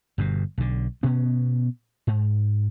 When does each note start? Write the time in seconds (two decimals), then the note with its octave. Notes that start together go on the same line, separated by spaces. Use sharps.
0.18 G1 G2 B2
0.58 B1 D3
1.03 B2 B3 C#4
2.07 G#2